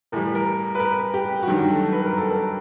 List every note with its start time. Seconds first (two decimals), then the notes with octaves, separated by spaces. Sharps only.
0.12 A2 E3 G3 A#4
0.35 A#4
0.75 B4
0.80 A#4
1.14 G4
1.43 F#4
1.47 G2 D#3 F#3 G4
1.71 A4
1.93 B4
2.06 A#4
2.18 A4
2.31 A#4